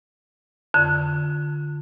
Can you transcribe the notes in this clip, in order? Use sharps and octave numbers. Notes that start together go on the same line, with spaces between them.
F2 D3